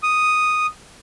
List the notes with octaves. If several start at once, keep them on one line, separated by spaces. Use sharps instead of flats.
D#6